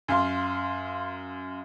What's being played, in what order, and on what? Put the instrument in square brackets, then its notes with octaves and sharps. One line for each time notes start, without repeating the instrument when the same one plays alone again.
[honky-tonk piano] F#2 F5 C6